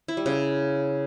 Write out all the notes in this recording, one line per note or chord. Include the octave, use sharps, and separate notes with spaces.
E4
G3
C#3